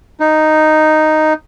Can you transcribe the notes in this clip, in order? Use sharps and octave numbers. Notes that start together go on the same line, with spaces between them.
D#4